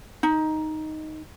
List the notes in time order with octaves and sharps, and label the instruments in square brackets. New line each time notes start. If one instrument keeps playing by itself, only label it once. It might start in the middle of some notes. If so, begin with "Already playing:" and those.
[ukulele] D#4